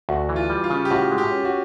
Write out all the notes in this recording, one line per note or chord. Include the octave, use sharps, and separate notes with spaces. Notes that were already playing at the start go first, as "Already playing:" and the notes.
D2 F#4
E3
F4
G3
F4
C#3
G4
A2 F#4
G#3
G4
C#4
F#4